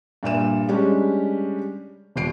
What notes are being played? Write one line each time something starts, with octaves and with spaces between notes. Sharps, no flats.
G2 A#2 E5 E7
G3 G#3 C#4 D4 G4
D#1 G3 C7 D7